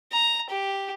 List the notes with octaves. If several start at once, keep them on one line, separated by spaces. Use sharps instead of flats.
A#5
G4